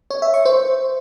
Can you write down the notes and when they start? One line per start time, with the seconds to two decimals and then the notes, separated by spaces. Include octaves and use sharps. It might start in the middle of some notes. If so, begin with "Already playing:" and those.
0.10 C#5
0.22 E5
0.34 C#6
0.45 C5